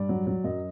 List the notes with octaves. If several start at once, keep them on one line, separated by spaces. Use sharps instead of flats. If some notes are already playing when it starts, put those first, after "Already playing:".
Already playing: G2 D5
F#3
F#3
F#2 D#5